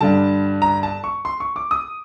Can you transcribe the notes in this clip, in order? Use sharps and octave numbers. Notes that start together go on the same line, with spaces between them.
G2 D3 G3 A5
A#5
A5
C#6
C6
C#6
D6
D#6